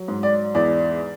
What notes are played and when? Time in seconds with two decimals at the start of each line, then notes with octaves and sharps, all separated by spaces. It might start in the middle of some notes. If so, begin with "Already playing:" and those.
Already playing: F#3
0.08 G#2
0.23 D5
0.55 E2 D5